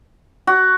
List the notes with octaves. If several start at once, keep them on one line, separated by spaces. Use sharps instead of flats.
F#4